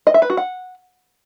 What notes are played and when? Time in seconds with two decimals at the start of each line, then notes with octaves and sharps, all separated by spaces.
0.07 D#5
0.14 E5
0.22 B4
0.30 F#4
0.37 F#5